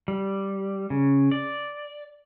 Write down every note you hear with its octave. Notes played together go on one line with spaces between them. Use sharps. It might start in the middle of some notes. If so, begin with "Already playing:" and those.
G3
C#3
D5